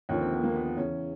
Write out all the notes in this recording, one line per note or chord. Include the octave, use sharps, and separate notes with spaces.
D#2 D3 F3 C#4
C4
B3
A#3
B3
B3
E2 C#3 E3 C#4